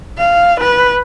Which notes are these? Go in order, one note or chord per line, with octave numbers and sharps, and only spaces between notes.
F5
B4